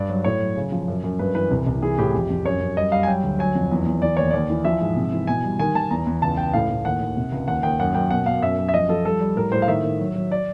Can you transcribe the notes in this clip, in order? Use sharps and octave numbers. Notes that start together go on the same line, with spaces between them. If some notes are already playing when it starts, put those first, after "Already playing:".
Already playing: G2 D5
F#3
A2 C#5
F#3
C#3
F3
F#2
F#2
G2 B4
E3 B4
C2
C2
E3 G#4
A2 G4
F2
F2
F#2 C#5
F#2
G3 D#5
G3 F5
G#5
F#3 G5
D2
F#3 G#5
F2
E2
E2
E3 D5
D#2 C#5
D#2 D5
E3
F3 E5
G#2
C3
E3
B2 G#5
G3
D#3 G#5
D#3 A5
E2 A#5
E2
C#2 A5
C#2 G5
A2 F5
A2
D#2 F#5
D#2
C3
C#2
D#2 F#5
D#2 G5
F#2 F#5
F#2 G5
B2 F#5
B2 F5
F#2 E5
F#2
E5
F3 D#5
F3 A4
G3 A4
G3
A2 A#4
A2 C5
F5
D#3 E5
D#3
F#3
F#3
D5